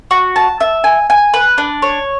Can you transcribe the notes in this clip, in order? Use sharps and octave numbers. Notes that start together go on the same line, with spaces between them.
F#4
A5
E5
G#5
G#5
B4
D4
C#5